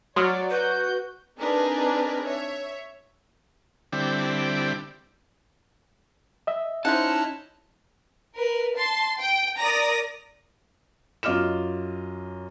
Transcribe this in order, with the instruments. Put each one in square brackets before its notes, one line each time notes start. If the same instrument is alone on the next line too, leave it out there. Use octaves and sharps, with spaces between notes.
[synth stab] F#3 [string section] C#5 D5 [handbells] C6 D#6 F6
[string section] F#4 G6 [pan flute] B4
[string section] C4 D4 D#4 G#4 A#4 B4
C#5 E5
[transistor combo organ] D3 G3 C4 E4 D5 G5
[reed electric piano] D#5 E5
[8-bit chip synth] C#4 D#4 E4 [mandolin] C5 F#5 [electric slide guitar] A5
[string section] A#4 B4
A5 C6
G5
A#4 D5 A#5 D#6 A#6
[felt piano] F#2 F4 D#5 D6 F6 E7